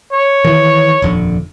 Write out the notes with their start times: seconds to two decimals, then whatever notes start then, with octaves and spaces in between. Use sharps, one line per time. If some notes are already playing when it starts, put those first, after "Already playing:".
0.13 C#5
0.45 D#3 E3
1.02 D#1 F2 D3